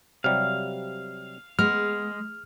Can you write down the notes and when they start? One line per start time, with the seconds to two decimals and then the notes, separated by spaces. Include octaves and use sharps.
0.24 C3 F#3 G3 F5
1.59 G#3 B3 F6